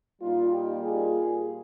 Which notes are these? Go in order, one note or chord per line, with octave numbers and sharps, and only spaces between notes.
A#2 G3 A#3 D#4 F4
D#4 G4
F4 G#4